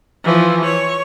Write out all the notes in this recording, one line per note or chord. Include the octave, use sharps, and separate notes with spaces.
E3 F3
C#5